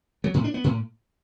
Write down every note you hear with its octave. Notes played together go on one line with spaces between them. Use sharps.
F#3
A2
D4
B3
A2